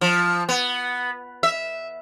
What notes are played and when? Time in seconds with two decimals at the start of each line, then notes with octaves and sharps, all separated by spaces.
0.01 F3
0.49 B3
1.43 E5